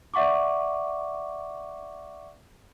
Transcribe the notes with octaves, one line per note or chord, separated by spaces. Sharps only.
D5 E5 F#5 C#6 D6